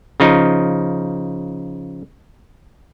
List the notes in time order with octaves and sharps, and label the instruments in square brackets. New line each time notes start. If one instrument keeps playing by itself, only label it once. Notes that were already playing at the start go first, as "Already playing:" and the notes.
[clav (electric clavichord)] C#3 F3 D#4